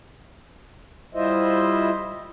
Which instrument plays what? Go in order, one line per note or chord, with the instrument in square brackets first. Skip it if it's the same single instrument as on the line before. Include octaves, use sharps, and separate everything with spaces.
[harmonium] G3 E4 F4 C5 D#5 E5